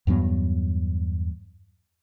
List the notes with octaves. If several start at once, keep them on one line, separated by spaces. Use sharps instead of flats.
E2 G2 F#3 B3